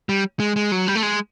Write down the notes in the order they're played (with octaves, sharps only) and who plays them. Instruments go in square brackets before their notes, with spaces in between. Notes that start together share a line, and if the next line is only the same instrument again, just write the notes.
[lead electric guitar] G3
G#3
G#3
F#3
G3
A3
G#3